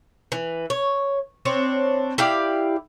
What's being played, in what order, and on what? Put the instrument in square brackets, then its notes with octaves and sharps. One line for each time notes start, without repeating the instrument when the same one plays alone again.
[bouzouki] E3
C#5
C4 D4 C#5
E4 G4 D5 F5